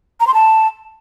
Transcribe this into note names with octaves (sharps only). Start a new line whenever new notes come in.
A#5
C6
A5